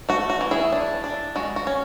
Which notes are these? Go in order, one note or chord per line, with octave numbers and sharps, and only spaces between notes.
A3 F#4
F#4
E3
E4 G#4
D4
D4
G#3 F#4
F#4
C#4